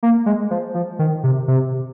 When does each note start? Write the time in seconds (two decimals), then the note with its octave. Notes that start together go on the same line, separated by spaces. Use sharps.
0.03 A#3
0.26 G#3
0.51 F3
0.75 F3
0.99 D#3
1.24 C3
1.48 C3